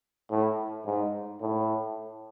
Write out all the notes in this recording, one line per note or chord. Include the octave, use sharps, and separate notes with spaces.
A2
G#2
A2